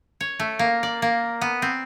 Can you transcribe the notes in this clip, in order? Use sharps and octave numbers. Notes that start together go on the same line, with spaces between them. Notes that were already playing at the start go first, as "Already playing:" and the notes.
C#5
A3
A#3
D5
A#3
B3
C4